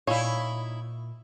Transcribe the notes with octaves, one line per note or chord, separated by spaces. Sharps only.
A#2 D#4 E4 C#5 F5 G#5